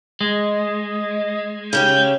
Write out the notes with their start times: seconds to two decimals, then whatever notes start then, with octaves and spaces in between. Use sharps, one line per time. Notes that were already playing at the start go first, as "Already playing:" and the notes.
0.21 G#3 D#5
1.73 C#3 C#4 G4 G6